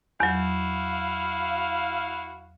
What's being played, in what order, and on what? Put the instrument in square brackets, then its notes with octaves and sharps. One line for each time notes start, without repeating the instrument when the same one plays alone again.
[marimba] E2 F#3 [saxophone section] E4 F#4 F5